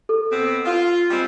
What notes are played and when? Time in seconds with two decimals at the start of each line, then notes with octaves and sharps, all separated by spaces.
0.09 A4
0.31 B2 B3 C4
0.66 F4 F5
1.11 G3 G#3 C4